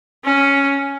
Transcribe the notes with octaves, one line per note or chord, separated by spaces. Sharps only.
C#4